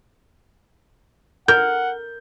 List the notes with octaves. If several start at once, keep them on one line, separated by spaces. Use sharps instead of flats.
A#4 F#5 G6